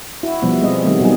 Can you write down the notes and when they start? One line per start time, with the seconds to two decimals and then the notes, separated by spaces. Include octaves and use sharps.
0.23 E4 F#4
0.42 B2 F3 G3 B3
0.60 G#3 C4 D#5
0.83 D#3 G3 A3 B3 C4
1.00 B2 F#3 G3 A3 D#4 G#4